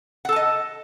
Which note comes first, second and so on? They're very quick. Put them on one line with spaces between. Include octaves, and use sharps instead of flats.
F#5 A4 A5 D#5